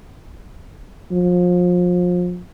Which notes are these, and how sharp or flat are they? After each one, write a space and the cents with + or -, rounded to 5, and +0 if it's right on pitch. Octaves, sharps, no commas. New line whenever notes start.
F3 +30